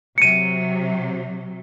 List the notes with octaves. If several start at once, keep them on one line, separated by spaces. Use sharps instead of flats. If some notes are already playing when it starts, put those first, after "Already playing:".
C3 F#3 C#7 D#7